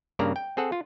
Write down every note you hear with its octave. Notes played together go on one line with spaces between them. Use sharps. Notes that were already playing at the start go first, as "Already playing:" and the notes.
G2 C#3 A#3 D5 A#5
G5
C4 G#4 A4 F#5
F4